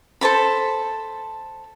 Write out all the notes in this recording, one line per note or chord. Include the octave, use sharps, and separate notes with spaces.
A4 C5 A5 B5